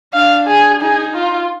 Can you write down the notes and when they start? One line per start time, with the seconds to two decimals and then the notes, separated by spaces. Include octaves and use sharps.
0.14 D4 F5
0.47 G#4
0.80 D#4 G#4
1.14 F4